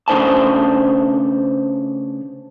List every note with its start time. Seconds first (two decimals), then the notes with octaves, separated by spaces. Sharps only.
0.08 C#3 A3 D4 C5 G#5 A5